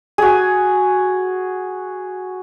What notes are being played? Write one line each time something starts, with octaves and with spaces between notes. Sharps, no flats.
F#4 G#4